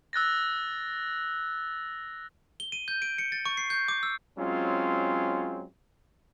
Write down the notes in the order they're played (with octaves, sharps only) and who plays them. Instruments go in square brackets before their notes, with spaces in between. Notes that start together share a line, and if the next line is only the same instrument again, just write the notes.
[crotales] E6 F#6 A6 A#6
[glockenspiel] G7
D#7
G6
D7
C#7
A6
C#6
C7
G6
D6
E6
[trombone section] F#3 G#3 C4 C#4 F4